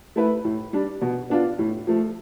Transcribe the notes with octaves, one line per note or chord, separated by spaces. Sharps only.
A3 E4 B4
A2
G3 D4
B2
B3 D4 F4
A2
F3 A3